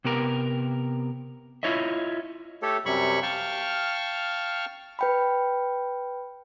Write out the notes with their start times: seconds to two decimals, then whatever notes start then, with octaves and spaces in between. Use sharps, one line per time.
0.04 C3 B3 G4 A#4
1.63 E4 F4 C#5 D#5 E5
2.62 A3 G4 A4 C#5
2.86 F#2 C3 G3 C#5 B5 C#6
3.23 F5 G5 A5 C#6 F6
4.99 B4 G5 B5